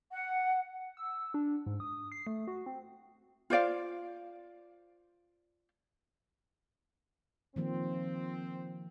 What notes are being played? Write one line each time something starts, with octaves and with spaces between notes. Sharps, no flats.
F#5
E6
D4
G#2
D#6
C7
A3
F#4
C4
F4 C5 D5 F5
D#3 F3 A#3 C4